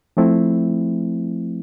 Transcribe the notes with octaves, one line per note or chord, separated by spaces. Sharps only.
F3 A3 C4 E4